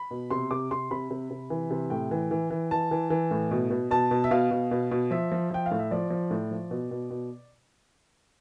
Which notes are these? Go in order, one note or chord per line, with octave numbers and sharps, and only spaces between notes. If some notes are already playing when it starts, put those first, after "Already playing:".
Already playing: B5
B2
C3 C6
C3 D6
C3 C6
C3 B5
C3
C3
E3
C3
A2 G5
E3
E3
E3
E3 A5
E3
E3
A2
B2
B2
B2 A5
B2
E5
B2 F5
B2
B2
B2
F3 E5
F3
F3 G5
F5
A2
E5
F3 D5
F3
A2
F3
B2
B2
B2